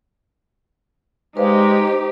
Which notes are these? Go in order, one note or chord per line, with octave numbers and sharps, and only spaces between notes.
G#3 D#4 G4 B4 C5 D5 F5